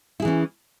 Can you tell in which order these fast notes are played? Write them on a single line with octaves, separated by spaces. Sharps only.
E4 G#4 E3 C#4